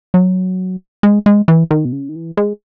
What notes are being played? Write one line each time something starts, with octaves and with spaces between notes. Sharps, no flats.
F#3
G#3
G#3
E3
D#3
B2
C#3
D#3
E3
G#3